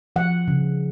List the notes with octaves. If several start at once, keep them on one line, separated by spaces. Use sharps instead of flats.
F3 F#5
C#3